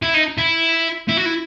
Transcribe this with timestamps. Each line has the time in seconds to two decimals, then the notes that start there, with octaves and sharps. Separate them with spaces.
0.02 E4
0.14 D#4
0.38 E4
1.08 E4
1.17 F#4
1.25 E4